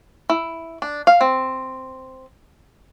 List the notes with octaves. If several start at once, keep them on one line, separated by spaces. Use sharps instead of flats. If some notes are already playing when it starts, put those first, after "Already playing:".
E4
D4
F5
C4